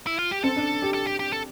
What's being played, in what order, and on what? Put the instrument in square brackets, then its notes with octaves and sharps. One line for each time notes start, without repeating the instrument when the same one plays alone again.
[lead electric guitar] E4
F4
G4
[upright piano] C4 [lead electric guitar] A4
[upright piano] D4
G4
[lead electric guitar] A4
G4
G4
A4